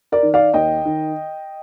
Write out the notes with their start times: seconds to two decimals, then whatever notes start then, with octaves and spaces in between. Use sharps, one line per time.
0.12 A#4 D5
0.23 D#3
0.34 D5 F5
0.54 D#2 D#5 G5
0.85 D#3